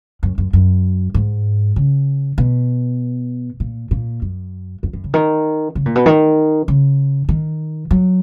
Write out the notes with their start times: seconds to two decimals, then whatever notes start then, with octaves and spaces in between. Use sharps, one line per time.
0.23 F#2
0.38 F#2
0.53 F#2
1.14 G#2
1.76 C#3
2.38 B2
3.60 A#2
3.91 A#2
4.22 F#2
4.83 F2
4.93 F#2
5.04 C#3
5.14 D#3
5.75 C#3
5.86 A#2
5.95 B2
6.06 D#3
6.68 C#3
7.29 D#3
7.91 F#3